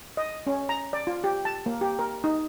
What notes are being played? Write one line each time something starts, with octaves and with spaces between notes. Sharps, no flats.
D#5
C#4
A#5
D5
F4
G4
A5
A#3
G4
A#4
D#4